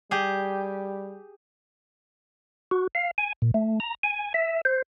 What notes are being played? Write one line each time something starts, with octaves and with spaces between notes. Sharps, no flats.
G3 G4 G#4
F#4
F5
G#5
A#2
A3
A#5
G#5
E5
C5